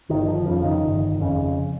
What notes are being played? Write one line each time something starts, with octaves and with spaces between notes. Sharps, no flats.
G1 D#3
F3
F2 C#3 F3
D#3
G1
F2 C#3